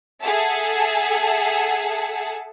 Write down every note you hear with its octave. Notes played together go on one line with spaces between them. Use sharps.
G#4 A4 E5 F#5 A5